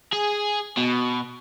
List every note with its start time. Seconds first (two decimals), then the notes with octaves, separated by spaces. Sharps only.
0.13 G#4
0.77 B2